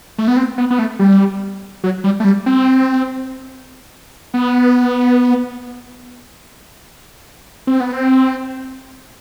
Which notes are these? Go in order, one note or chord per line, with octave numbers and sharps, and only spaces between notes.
A3
B3
C4
B3
B3
A3
G3
F#3
G3
A3
G3
C4
B3
C4
B3
C4